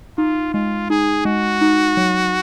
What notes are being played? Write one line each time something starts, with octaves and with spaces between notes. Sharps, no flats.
D#4 F4
G#3 F4
D#4 G#4
G#3 F#4
D#4
F#3